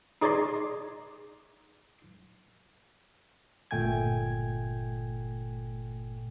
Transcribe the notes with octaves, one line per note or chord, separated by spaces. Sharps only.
D#4 G#4 D5 G#5 A#5 C6
G1 A#2 A3 G5 G#5 G#6